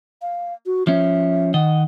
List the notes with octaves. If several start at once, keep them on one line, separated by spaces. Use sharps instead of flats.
F5
F#4
F3 C#4 E5
D#3 D#5 F#5